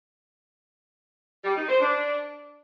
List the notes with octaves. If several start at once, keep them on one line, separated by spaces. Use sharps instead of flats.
G3
D#4
C5
D4